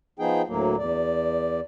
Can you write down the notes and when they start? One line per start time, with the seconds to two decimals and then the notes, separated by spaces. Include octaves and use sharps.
0.19 F3 B3 D#4 G#4 G5
0.48 D2 A2 F#3 A#3
0.78 E2 D5